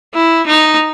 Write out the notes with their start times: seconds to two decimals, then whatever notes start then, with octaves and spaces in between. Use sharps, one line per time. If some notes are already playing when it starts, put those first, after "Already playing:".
0.14 E4
0.47 D#4